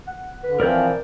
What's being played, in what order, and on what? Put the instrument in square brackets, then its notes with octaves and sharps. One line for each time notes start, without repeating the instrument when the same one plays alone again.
[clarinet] F#5
[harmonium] D3 [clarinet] B4
[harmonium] E3 F3 C4 [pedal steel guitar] A#4 D5 G6